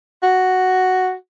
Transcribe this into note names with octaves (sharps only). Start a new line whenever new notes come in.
F#4